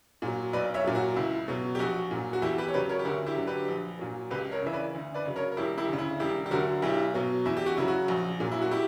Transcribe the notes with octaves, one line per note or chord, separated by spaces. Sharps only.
A#2 F#3
B1 B4 D5
C#5 E5
A#2 F#3
F#4
C#2 E4
B2 F#3
G4
A#1 F#4
A#2 F#3
F#4
E2 E4 G4
G4 B4
C#5
C#3 F#3 G4 B4
A#4 C#5
G4
D2 F#4 A#4
E4 G4
D3 F#3
G4 B4
A#1
A#2 F#3
C#2 G4 B4
A#4 C#5
C#3 E3 E5
B4 D5
D2
B4 D5
C#3 F#3
A#4 C#5
A#4
E1 E4 G4
E4 G4
D2 C#3
E4
E1 E4 G4
G4
D2 D3 F#3 F#4 A#4
B1 E4 G4
B2 F#3
E2 E4
G4
F#4
C#3 F#3 E4
F#4
A#1
A#2 F#3
E4
F#4
E4 G4